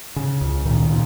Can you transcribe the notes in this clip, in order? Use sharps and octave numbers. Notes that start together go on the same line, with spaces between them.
C#3
C#2
A#2 D#3
A#2